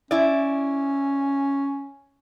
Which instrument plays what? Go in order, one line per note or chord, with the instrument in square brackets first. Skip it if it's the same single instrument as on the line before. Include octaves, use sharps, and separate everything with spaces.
[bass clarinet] C#4 [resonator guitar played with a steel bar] E4 D5